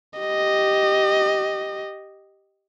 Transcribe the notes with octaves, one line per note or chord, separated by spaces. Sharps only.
G4 D#5